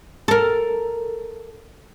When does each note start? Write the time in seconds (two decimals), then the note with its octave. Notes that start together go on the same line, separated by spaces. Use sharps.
0.28 A4 A#4